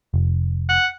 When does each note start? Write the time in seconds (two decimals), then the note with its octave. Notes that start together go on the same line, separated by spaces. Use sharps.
0.14 F1
0.69 F#5